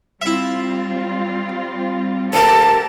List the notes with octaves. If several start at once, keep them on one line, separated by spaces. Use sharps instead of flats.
G3 C4 E4 F4 E5
D2 A#3 G4 A4 A#4 D5 A5